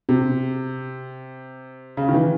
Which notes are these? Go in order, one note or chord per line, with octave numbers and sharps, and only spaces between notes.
C3
C#3
D#3
E3